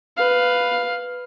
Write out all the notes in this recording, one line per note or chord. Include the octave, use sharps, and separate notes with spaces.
B4 F5